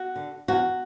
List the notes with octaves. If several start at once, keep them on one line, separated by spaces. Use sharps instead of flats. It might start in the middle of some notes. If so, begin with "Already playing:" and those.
Already playing: F#4
D3
E2 F#4